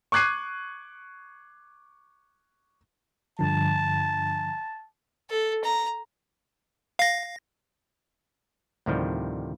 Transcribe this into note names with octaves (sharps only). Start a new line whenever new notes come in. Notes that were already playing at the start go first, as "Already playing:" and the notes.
C#6 D6 F#6 G#6 C7 D#7
G2 D3 F3 A5
A4
A#5
F5 A#6
D2 A2 C3 D#3 F3 G3